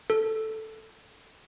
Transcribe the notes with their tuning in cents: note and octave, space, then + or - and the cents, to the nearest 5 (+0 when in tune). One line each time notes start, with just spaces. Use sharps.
A4 +0